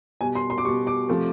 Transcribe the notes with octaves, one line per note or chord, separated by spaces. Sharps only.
B2 G3 G#5
C6
C6
D6
B2 G3 C#6
D6
C3 F3 A3